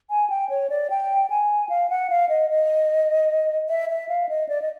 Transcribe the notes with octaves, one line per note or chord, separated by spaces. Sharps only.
G#5
G5
C#5
D5
G5
G#5
F5
F#5
F5
D#5
D#5
E5
E5
F5
D#5
D5
D#5